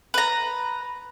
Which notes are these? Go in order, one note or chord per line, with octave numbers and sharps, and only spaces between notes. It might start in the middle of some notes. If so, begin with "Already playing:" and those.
B4 A#5